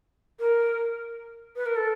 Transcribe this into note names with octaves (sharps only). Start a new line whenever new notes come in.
A#4
B4
A#4
A4